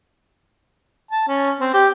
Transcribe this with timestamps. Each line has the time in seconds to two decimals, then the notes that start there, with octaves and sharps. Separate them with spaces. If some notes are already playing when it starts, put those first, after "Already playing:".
1.11 A5
1.28 C#4
1.61 C4
1.74 G4